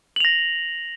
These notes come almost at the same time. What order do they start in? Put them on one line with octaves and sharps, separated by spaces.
F#7 F7 A#6